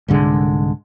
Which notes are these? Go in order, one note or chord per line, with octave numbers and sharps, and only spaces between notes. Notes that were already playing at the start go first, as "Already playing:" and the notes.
C2 G#2 D3 G#3